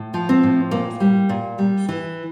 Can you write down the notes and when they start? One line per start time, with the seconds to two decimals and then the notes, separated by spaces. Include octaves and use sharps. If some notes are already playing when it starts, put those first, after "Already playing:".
Already playing: A2
0.14 F3
0.29 C4
0.43 A2
0.71 A#2 A#3
1.00 G3
1.29 A#2
1.58 G3
1.89 E3